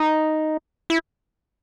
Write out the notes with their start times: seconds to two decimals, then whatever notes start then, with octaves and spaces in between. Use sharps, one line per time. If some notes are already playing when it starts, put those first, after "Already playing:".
Already playing: D#4
0.90 E4